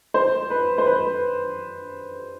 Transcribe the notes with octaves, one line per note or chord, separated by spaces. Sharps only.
C5
B4
C5
B4